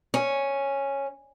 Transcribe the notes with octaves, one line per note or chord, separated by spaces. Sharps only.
C#4